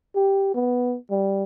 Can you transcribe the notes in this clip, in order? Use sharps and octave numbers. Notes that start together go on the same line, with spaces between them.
G4
B3
G3